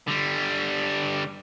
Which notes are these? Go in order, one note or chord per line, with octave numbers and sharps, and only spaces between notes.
D3 G3